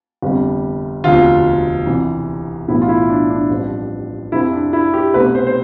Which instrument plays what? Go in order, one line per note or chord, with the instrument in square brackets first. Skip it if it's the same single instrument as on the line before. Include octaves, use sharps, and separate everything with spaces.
[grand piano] G1 F2 C3 G3
E1 D2 C3 F3 F4
C2 C3 E3
B1 A2 E3 B3 E4
F4
E4
D4
D4
A1 G2 F3 C4
F2 C3 F3 C4 E4
D4
E4
G4
C2 B2 A3 C4 B4
C5
C5